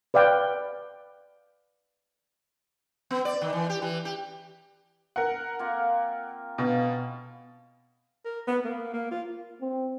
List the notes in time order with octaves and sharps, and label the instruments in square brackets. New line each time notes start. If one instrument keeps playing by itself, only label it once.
[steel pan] B4 D5 F5 G5
[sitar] B3
D5
D#3
E3
G4
E3
G4
[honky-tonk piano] A#4 F#5
[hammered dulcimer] A#3 C4 F4
[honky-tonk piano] B2 [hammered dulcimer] F5 G#5
[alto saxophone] A#4
B3
A#3
A#3
F4
[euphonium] C4